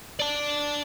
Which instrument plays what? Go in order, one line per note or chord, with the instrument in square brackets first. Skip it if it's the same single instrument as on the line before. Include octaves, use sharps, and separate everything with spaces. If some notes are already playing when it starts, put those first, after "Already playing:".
[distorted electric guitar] D5 A5